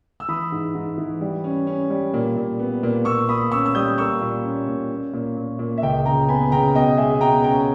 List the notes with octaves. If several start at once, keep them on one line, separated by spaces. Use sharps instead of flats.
E6
E3 B5 D#6
G#2
G#2
E3
G3
C#4
C#4
G3
A#2
A#2
B3
A#2
A#2 C#6 E6
A#2 B5 D#6
C#4 C#6 E6
E6
G3 D#6 G6
A#3 C#6 E6
A#2
C#4
A#2
C#4
A#2
A#2
A#2
E5
C#2 D#5 G5
C#3 G5 A#5
B3 G#5 B5
C#3 G5 A#5
B2 D#5 G5
G#3 E5 G#5
B2 G5 A#5
C#4 G5 A#5